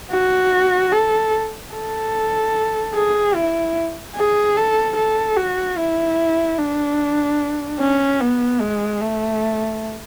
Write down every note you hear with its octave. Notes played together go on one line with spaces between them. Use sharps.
F#4
A4
A4
G#4
E4
G#4
A4
A4
F#4
E4
D4
C#4
B3
G#3
A3